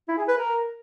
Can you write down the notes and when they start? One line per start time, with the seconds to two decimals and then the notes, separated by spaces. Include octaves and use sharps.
0.08 E4
0.17 G#4
0.28 B4
0.37 A#4